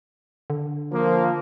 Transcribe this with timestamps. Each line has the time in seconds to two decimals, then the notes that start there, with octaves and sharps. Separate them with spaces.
0.50 D3
0.92 F3 A#3